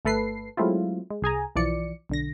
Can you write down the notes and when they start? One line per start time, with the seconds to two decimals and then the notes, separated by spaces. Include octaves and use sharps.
0.05 G1 A3 A4 B4 C7
0.57 F#3 G#3 A3 C4 E4 F4
1.11 G#3
1.22 C2 G#4 G#5 A#5
1.56 B1 E3 F3 D5 C#7
2.09 B1 D3 A#6